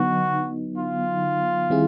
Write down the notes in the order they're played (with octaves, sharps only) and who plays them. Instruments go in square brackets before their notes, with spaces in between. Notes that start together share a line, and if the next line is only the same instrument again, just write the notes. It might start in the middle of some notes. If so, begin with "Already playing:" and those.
Already playing: [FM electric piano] D3 F#3 B3 D#4 [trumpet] F#4
[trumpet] F4
[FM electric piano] D#3 G3 C4 E4 G#4